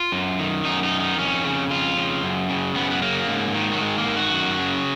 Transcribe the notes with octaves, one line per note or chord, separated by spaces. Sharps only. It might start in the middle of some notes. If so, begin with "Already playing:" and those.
Already playing: F4
F#2
D#3
F#2 D#4
D#4
D#3
D#4
F2 C#4
C#3
F2 F4
C#3
F#2
C#3
F#2 B3
B3
C#3 A#3
G#2
D#3
F#3
G#2 G#3
A#3
D#3
F#4
F#2
C#3